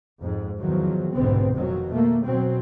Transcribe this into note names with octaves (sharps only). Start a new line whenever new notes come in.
F2 G#2
E2 D#3 F3 F#3
F1 B1 G#2 D3 B3 C4
F2 B2 D#3 F#3
A3 A#3
B2 F#3 C4